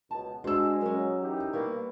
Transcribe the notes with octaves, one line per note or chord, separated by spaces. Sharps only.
C#2 B2 A5
G#3 D4 F#4 C5 E6
F#3 C#4 A#4
E3 D#4 G4
G3 A#3 B3 C#5